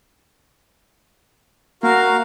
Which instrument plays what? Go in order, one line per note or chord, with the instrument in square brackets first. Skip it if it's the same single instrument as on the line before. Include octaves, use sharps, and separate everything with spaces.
[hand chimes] A#3 [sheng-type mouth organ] F#4 A#4 F5